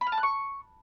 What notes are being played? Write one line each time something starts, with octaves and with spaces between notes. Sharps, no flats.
B5
F6
A5
F#6
C#6